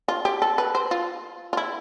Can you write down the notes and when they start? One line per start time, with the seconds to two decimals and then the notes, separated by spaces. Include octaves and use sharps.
0.08 F4
0.25 G4
0.42 A4
0.58 B4
0.75 C5
0.91 F4
1.53 F4
1.57 E4